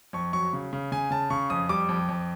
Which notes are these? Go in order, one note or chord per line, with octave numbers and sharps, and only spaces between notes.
F2 C#6
F#3 C#6
C#3
C#3
C#3 G#5
C#3 A5
C#3 C#6
F2 D#6
G3 D6
F2
F2